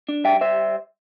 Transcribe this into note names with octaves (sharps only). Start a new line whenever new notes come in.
D4
G3 E5 G5
G3 C5 E5